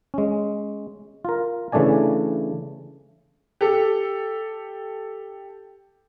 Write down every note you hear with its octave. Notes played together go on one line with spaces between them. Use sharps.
G#3 C#4
F4 A#4
C#3 E3 A3 D4 D5 G#5
G4 A4